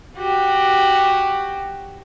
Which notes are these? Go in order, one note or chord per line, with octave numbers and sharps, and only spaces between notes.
F#4 G4